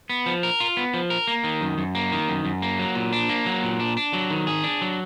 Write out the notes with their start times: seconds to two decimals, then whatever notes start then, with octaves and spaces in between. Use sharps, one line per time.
0.10 B3
0.26 F3
0.43 A#4
0.60 F4
0.77 B3
0.94 F3
1.10 A#4
1.28 A#3
1.44 D#3
1.61 F#2
1.78 F#2
1.95 A#3
2.12 D#3
2.29 F#2
2.45 F#2
2.62 A#3
2.79 F#3
2.95 A#2
3.13 D4
3.29 A#3
3.46 F#3
3.63 A#2
3.80 D4
3.97 D4
4.13 F#3
4.30 D#3
4.47 G#4
4.64 D4
4.82 F#3